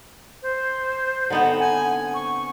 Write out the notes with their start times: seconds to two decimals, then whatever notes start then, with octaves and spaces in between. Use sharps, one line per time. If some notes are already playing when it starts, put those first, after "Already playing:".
0.42 C5
1.30 D3 B3 C4 D#4
1.60 G#5
2.14 C#6